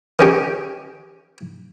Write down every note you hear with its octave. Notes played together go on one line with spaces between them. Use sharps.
D#3 C#4 G4